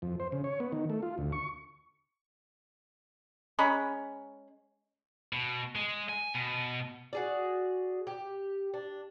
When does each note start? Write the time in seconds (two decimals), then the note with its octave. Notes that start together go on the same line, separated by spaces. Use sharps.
0.02 F2
0.20 C5
0.32 C#3
0.44 C#5
0.60 B3
0.72 D#3
0.90 A3
1.02 F4
1.18 D2
1.32 C#6
3.59 G#3 C#4 A#5 B5
5.33 B2
5.75 G#3
6.09 G#5
6.35 B2
7.13 F#4 G#4 D5
8.07 G4
8.74 D4